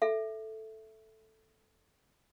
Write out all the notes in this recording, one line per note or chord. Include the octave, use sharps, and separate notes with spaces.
A4 E5